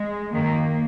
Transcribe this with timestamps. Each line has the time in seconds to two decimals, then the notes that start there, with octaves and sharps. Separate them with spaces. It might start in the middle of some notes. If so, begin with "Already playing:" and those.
Already playing: G#3
0.32 F#2 D#3 A#3